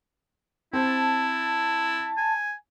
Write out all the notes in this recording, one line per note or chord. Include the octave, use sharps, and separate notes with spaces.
C4 E4 A5
G#5